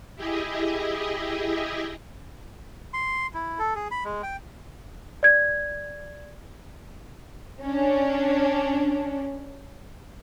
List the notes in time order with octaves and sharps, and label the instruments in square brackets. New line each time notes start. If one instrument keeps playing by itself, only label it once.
[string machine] E4 G4 G#4 D#5 E5
[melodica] C6
E4
A4
G#4
B5
G#3
G5
[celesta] D5 G#6
[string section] C#4 D4